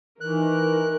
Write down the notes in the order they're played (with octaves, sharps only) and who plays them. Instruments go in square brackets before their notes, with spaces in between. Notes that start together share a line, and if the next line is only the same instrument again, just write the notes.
[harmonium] D#3 E3 [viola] A#4 [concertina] F#6